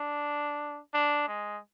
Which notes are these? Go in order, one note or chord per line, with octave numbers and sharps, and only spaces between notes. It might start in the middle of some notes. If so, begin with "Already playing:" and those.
Already playing: D4
D4
G#3